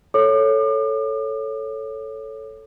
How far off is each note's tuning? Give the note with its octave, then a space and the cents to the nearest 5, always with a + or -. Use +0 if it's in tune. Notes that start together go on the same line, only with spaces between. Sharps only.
A4 +0 C#5 +0 D6 +40